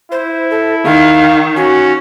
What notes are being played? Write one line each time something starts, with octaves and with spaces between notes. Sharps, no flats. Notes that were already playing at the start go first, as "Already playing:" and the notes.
E4 C5
A4
D#3 F5
C#4 F#4